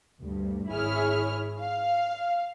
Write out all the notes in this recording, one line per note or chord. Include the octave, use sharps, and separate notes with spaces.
D2 G2
G#1 E4 G#4 C#5 F6
F5